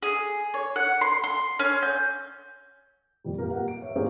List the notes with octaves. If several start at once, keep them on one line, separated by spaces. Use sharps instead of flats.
G#4
C#5
F#5
C6
C6
C#4
G6
F2 A#2 G3
A#3 G4 A#4
F#5
D7
C#5 E5
A#3 C4 C#4 G4 G#4